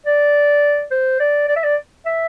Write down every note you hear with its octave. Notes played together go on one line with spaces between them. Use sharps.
D5
C5
D5
D5
E5
D5
E5